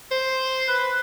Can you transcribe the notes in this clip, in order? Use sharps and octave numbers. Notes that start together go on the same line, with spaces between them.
C5
B4